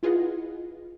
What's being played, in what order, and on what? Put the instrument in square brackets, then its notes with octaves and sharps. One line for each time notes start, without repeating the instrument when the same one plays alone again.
[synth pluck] E4 F4 G#4 B4 D#5 F#5